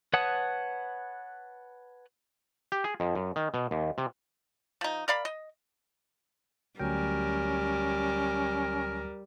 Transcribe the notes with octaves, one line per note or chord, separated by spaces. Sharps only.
B4 C#5 F#5 A5 D#6
G4
G#4
F2
F#2
D#3
B2
D#2
C3
F3 D#4
A#4 D5 F5 B5
D#5
D2 F#3 G3 C#4 A#4 G5